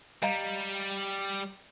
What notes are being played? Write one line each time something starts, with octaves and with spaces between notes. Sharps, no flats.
G3 D#5 F5 A#5